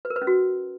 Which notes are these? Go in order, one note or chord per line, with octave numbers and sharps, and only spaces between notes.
B4
A#4
B4
C#4
F#4